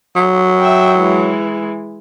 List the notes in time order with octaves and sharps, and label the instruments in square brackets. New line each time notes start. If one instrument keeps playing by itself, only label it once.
[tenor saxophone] F#3
[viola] E5 G5
E3 G#3